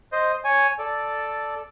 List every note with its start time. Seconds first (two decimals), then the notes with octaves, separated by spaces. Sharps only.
0.12 C5 D#5
0.44 C#5 G#5
0.79 A4 D5